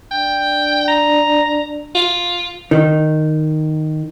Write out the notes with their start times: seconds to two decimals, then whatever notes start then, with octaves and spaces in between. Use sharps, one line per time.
0.11 D4 G5
0.88 A#5
1.95 F4
2.71 D#3